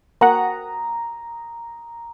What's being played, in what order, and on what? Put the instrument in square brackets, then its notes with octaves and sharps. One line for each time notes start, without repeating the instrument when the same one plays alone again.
[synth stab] A#3 F#4 F#5 [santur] A#5 D#6